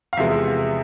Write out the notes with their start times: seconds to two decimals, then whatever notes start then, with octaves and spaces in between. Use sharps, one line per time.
0.13 F5
0.17 E2 C3 F3 G#3 B3 E5